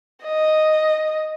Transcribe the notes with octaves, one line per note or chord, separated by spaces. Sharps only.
D#5